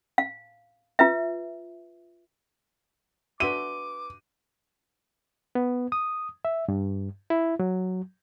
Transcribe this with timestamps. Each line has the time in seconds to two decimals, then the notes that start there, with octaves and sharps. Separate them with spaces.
0.18 F5
0.99 F4 B4 E5
3.40 D4 F#4 B4 E5 C6 D6 D#7 G7
5.55 B3
5.92 D#6
6.45 E5
6.68 G2
7.30 E4
7.60 F#3